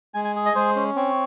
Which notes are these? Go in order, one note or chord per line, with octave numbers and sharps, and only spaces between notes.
G#3 G#5
G#5
G#4
D#5
G#3 C5
C#4
C4 C#5